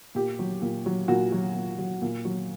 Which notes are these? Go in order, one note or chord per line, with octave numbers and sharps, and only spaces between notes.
A#2 G4
F#3
A#2
F#3
A#2 F#4
F#3
A#2
F#3
A#2
F#3